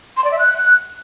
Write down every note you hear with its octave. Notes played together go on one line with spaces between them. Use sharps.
C6
D5
E5
F#6